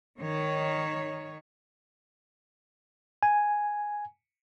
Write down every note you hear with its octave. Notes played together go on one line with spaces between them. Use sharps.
D#3 C#5
G#5